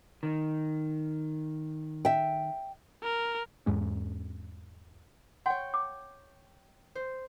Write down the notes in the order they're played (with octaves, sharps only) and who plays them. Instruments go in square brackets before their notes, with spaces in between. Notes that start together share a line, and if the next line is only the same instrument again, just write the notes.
[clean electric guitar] D#3
[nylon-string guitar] E5 G5
[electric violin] A#4
[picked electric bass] E2 G#2 G#3 C#4
[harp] C#5 G5 [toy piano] F#5 C6
[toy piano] D6
[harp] C5